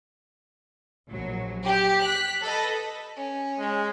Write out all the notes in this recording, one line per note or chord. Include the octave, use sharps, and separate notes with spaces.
A#1 F#3
G4
F#6 B6
A4 B4 D#5
C#4
G#3